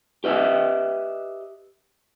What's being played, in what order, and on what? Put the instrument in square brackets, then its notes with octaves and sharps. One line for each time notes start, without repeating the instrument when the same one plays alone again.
[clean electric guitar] G4 B4 D#5 E5